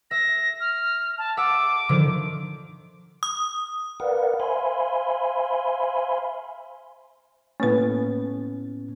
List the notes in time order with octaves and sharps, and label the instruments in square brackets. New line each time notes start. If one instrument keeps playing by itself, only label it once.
[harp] E5 [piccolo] A#6
[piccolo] F6
A5
[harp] E5 F#5 E6 [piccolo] D6
[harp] D3 D#3 F3
[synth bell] D#6
[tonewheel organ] A#4 B4 D5 F5 F#5
C5 E5 F5 G#5 B5 C6
[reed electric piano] A2 B3 C#4 [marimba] A#3 B4